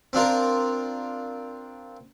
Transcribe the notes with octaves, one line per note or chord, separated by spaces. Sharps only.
C4 D4 F4 A#4